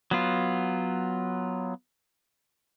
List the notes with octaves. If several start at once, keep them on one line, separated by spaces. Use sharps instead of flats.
F#3 B3 F4